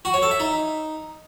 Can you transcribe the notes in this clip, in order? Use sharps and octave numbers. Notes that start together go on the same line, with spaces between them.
F#4
C#5
A4
E5
D#4